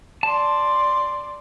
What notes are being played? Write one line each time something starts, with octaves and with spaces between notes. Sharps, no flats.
D5 A5 C6